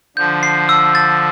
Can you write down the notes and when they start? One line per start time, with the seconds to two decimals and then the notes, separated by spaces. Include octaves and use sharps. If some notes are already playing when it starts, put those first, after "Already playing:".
0.17 D3 F3 G6
0.43 C7
0.69 E6
0.95 A6